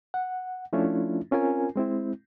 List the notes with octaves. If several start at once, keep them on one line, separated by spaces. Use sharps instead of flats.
F#5
F3 A3 C#4 D4 E4 F4
C4 C#4 F4 A#4 G#5
G#3 C4 E4